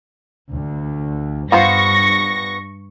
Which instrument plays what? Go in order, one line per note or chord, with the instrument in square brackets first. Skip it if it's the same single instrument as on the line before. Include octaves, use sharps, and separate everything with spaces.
[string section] D2
[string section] G2 C#6 A#6 [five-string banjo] B3 F4 C5